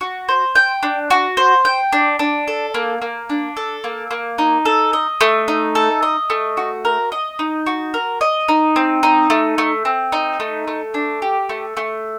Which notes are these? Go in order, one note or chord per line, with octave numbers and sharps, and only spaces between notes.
F#4
C5
G5
D4
F#4
C5
G5
D4
D4
A4
A#3
A#3
D4
A4
A#3
A#3
D#4
A4
D#5
A3
D#4
A4
D#5
A3
F#4
A#4
D#5
D#4
F#4
A#4
D#5
D#4
C4
D#4
A3
A3
C4
D#4
A3
A3
D4
G4
A3
A3